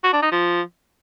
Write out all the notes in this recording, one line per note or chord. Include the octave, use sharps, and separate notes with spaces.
F#4
D4
D#4
F3